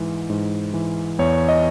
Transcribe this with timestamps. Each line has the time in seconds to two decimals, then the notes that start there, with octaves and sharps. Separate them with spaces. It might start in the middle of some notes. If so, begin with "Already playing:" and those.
Already playing: G#2 E3
0.30 G#2
0.74 E3
1.19 E2 C#5
1.48 D#5